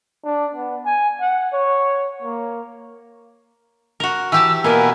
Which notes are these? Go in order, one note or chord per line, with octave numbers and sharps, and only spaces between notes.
D4
B3
G#5
F#5
C#5
A#3
F#4 A#4
E3 G4 A5 E6
B2 A#3 B3 A#4 G#5